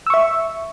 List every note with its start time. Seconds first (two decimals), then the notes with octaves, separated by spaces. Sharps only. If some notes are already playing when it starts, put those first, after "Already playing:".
0.07 E6
0.10 C#6
0.14 E5